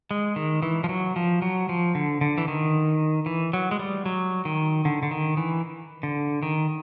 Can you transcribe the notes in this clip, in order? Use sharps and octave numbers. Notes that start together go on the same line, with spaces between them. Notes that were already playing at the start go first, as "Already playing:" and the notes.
G#3
D#3
E3
F3
F#3
F3
F#3
F3
D3
D3
E3
D#3
E3
F#3
G#3
G3
F#3
D#3
D3
D3
D#3
E3
D3
D#3